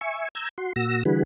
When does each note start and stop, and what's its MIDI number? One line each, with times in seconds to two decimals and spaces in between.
0.01 0.28 76
0.01 0.28 80
0.01 0.28 85
0.35 0.49 82
0.35 0.49 88
0.35 0.49 91
0.35 0.49 92
0.58 0.73 66
0.58 0.73 84
0.76 1.03 46
0.76 1.03 66
0.76 1.03 88
0.76 1.03 94
1.05 1.23 50
1.05 1.23 52
1.05 1.23 55
1.05 1.23 66
1.05 1.23 68
1.05 1.23 71